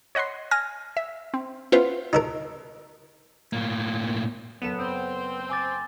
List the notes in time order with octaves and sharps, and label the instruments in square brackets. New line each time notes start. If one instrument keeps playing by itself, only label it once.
[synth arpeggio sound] C#5 D#5 F#5 B5 C6
G#5 F6 A#6
E5
C4
B3 C#4 E4 F4 B4 C5
[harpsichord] D#4 A4 A#4
[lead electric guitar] A2 A#3
[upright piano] F#1 A4 E7 [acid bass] B3
[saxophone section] C4
[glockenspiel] G#5 D6 A6